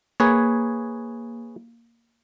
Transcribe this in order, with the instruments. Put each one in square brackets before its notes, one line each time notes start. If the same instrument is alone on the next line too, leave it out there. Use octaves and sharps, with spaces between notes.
[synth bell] A#3 [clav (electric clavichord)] G#4 B4 C#5